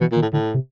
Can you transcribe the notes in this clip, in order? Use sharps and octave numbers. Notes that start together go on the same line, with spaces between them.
B2 E3
A#2
D#3
A2
A2 D3
C3